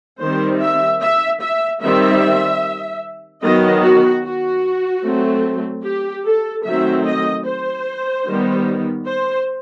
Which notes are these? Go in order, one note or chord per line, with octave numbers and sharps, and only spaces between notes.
D#3 G3 C4 C5
E5
E5
E5
D#3 G3 C4 E5
D#3 F#3 B3 D#5
F#4
F#4
F#3 A3 C4
G4
A4
D#3 F#3 A3 C4 E5
D#5
C5
D#3 G3 B3
C5